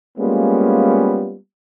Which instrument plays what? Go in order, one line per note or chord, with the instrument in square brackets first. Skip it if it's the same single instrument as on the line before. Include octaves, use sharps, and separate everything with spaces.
[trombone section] G3 G#3 A#3 B3 C#4 F4